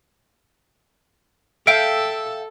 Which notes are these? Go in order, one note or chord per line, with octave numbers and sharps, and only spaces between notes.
A4 E5 F5 G5 D7